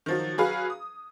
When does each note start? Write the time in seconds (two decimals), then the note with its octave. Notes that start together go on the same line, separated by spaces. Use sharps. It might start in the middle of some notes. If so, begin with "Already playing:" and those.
0.06 D#3 F3 F#3
0.38 F#3 G#4 B4 F5
0.70 D#6